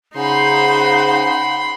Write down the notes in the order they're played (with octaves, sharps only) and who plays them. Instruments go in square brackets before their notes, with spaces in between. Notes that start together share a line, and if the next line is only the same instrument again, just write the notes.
[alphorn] C#3 [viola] D#4 C5 [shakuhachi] F#5 [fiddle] B5 C6